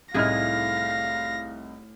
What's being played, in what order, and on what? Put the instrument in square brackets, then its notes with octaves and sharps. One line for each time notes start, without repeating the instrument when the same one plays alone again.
[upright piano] C2 D#4 F6 [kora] A2 E4 G#4 [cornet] F5 [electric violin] A#6